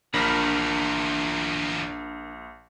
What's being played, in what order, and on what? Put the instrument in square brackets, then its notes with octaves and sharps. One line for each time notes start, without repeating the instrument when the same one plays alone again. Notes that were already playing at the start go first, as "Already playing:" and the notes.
[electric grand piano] A#1 A#6 B6 [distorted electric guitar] E2 A#2 [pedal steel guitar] D4 A#4 B5